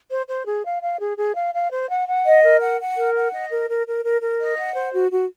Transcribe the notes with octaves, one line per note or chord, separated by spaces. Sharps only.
C5
C5
G#4
F5
F5
G#4
G#4
F5
F5
C5
F#5
F#5
D#5
A#4
F#5
F#5
A#4
F#5
D#5
A#4
A#4
A#4
A#4
A#4
D#5
F#5
C5
F#4
F#4